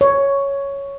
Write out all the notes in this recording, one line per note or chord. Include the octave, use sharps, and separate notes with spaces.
C#5